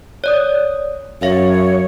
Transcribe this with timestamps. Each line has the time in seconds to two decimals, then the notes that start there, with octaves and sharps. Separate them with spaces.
0.24 C#5 D5 D#6
1.22 F#2 C#5 E5 F5